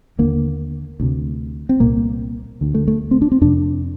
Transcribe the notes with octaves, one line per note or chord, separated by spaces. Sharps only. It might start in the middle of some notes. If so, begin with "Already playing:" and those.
D#2 D3 A#3
D2 C3
C4
C2 A#2 A#3
D2 D3
A3
A3
C4
D4
C4
F2 C3 D4